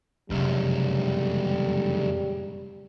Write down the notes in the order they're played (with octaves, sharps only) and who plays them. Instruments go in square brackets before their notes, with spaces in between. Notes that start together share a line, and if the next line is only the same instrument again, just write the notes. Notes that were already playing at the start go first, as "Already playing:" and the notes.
[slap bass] F1 [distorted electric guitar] C#2 F#2 [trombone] G3